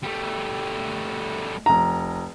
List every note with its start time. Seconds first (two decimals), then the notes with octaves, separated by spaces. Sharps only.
0.03 G3 A3
1.66 F1 A#5